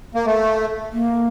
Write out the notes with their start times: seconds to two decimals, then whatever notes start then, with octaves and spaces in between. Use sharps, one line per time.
0.15 A#3
0.26 A3
0.92 A#3